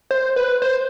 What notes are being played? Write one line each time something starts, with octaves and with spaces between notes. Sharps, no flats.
C5
B4
C5